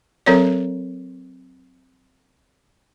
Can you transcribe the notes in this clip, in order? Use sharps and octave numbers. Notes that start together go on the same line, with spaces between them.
F#3 C4 A4 A#4 C#5 D5